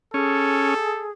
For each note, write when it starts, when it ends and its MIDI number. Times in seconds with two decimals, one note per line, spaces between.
0.14 0.74 61
0.14 1.12 68
0.14 1.09 69